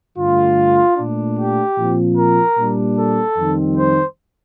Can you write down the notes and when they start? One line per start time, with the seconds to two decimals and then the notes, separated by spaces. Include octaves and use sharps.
0.17 G2 D3 A3 F4
0.97 A#2 A3 D4
1.38 G4
1.78 A#2 F3 C4
2.17 A#4
2.58 A#2 G3 A#3 D4
2.98 A4
3.37 F2 D#3 G3 C4
3.77 C5